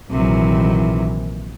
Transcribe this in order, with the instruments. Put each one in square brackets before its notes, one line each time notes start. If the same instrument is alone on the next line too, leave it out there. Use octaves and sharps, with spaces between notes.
[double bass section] A#1 D#3 E3 [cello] C3 F#3